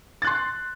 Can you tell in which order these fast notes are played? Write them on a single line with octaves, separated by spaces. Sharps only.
A6 F#6 C6